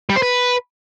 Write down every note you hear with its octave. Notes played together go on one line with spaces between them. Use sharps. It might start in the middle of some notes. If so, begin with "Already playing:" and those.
G3
C5
B4